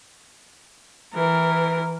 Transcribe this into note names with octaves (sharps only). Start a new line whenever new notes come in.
E3 A#4